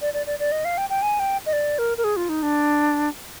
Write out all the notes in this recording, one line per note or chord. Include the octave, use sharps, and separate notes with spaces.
D5
D5
D5
D5
D#5
F5
G5
G5
G#5
G5
D#5
D5
A#4
A#4
G#4
F4
D#4
D4